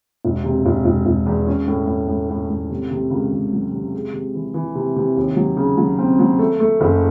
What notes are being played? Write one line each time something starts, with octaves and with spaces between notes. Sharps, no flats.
E1
C3
E1
E1
E1
E2
C#4
A2
A2
A2
A2
A2
C3
C3
C#2
C#2
F#3
C3
G#3
C3
E3
E3
C3
C3
D#2
F#3
C#3
F#3
C4
F#3
A3
A3
F#1